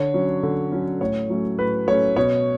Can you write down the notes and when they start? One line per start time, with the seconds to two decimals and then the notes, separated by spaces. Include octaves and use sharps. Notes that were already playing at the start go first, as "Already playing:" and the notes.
Already playing: D3 C#5
0.14 F#3 C#4
0.43 D3
0.72 F#3 C#4
1.01 A2 C#5
1.30 F#3 A3 C#4
1.59 A2 B4
1.87 F#3 A3 C#4 C#5
2.16 B2 C#5